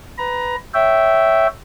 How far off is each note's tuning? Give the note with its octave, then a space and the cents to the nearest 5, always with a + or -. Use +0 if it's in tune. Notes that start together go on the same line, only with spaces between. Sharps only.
B4 +15 A#5 +20
C#5 +0 E5 +0 G5 -15